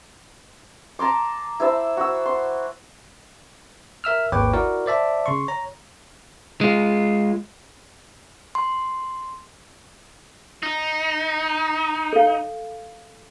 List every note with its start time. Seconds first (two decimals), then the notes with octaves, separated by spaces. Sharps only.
0.99 A5 A#5 C6 D6
1.60 E4 C5 E5 A5
1.97 F#4 E6
2.26 C6
4.04 A#4 E5 E6 F6
4.32 G#1 D#2 B4 C#5 G5 D6
4.53 E4 F#4 A#4 D5
4.86 C5 D5 E5 A5
5.26 C#3 C6 C#6
5.48 C#5 A#5
6.61 G#3 F4
8.55 C6
10.63 D#4
12.13 A4 F5